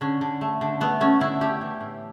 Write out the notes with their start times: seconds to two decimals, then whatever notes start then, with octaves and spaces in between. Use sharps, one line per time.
0.01 D3 C#4
0.21 D3
0.41 A3
0.61 D3
0.81 A3 B3
1.00 A3 C#4
1.20 D3 E4
1.41 A3 G4
1.61 E3
1.81 A2